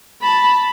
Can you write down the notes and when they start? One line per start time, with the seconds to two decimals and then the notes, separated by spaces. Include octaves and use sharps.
0.23 A5 B5